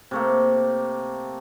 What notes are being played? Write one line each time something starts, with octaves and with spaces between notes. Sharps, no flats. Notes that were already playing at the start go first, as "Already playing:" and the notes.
C3 A3 A#3